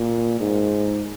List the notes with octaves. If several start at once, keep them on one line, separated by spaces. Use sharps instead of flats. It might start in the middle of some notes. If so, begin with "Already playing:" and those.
Already playing: A#2
G#2